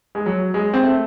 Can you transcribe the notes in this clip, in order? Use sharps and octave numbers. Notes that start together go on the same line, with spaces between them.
G#3
F#3
G#3
C4
A3